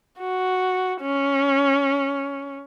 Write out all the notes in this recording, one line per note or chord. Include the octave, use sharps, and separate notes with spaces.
F#4
C#4